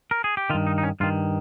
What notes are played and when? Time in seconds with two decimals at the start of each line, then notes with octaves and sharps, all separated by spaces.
0.11 A#4
0.24 G#4
0.37 G4
0.50 D#3 F4
0.54 G2
0.67 D#4
0.78 D#4
0.83 C#4
1.00 G2 D#3 F4